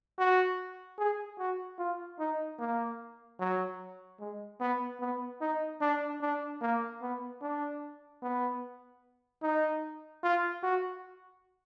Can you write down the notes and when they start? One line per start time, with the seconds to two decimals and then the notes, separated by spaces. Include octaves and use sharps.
0.19 F#4
0.98 G#4
1.39 F#4
1.79 F4
2.19 D#4
2.59 A#3
3.39 F#3
4.20 G#3
4.60 B3
5.00 B3
5.41 D#4
5.81 D4
6.21 D4
6.61 A#3
7.02 B3
7.42 D4
8.23 B3
9.43 D#4
10.23 F4
10.63 F#4